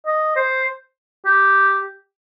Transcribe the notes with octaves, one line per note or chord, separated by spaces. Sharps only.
D#5
C5
G4